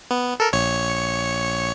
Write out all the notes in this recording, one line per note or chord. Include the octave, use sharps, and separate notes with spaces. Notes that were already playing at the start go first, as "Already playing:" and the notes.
B3
A4 A#4
A#1 C#5 C#7